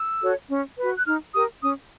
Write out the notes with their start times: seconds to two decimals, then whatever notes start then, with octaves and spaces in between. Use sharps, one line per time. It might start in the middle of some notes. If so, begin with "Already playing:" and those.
Already playing: E6
0.21 F#4 A4 C#5
0.49 C#4
0.77 F#4 B4
0.98 F#6
1.06 D#4 F6
1.34 G4 A#4 D#6
1.62 C#4 D#6